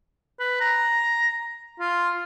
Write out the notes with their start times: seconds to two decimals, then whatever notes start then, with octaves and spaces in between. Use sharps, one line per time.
0.40 B4
0.61 A#5
1.80 F4